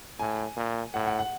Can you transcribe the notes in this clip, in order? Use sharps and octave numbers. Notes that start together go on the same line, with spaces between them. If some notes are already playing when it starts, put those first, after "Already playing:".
A2 G#5
A#2
A2 F#5
F#5
F#5